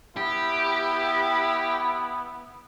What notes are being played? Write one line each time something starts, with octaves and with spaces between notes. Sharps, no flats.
B3 E4 G4